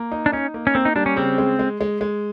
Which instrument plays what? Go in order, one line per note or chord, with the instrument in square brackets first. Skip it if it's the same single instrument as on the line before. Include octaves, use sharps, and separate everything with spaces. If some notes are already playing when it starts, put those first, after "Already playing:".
Already playing: [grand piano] A#3
D#4
[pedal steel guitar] D4
[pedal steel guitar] C#4 [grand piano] D#4
[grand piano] A#3
[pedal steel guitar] C#4
[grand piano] A#3 [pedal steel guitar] C4
[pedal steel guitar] D#4
[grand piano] G3 [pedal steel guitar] D4
[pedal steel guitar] C#4
[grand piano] C#3 [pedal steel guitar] C4
[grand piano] G#3
G#3
G#3
G#3